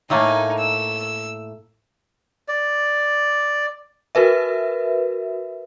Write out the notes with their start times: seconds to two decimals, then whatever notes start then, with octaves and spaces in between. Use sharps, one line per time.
0.10 A2 A3 A#3 D#4 G#5
0.58 E6
2.48 D5
4.15 F#4 A#4 B4 E5